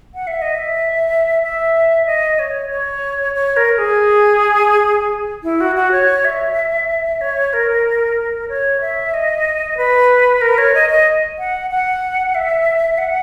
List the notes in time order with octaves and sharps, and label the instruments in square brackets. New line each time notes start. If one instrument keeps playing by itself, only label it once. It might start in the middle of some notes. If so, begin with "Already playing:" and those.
[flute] F#5
E5
D#5
E5
E5
D#5
C#5
C#5
C#5
A#4
G#4
E4
F#4
F#4
C#5
E5
C#5
A#4
C#5
E5
D#5
B4
A#4
C#5
D#5
D#5
F#5
F#5
E5
F#5